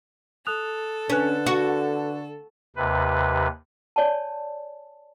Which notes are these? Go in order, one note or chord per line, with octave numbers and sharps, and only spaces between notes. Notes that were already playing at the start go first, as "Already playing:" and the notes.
A4 D#6 F#6 F7
D3 C#4 D4 B4 F#6
F#4
D#2 C3 B4
C#5 D5 G#5 A5